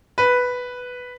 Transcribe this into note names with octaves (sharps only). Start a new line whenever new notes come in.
B4